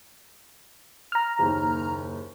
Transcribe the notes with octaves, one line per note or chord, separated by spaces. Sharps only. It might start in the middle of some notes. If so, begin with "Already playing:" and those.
A#5 F6
F#1 D#2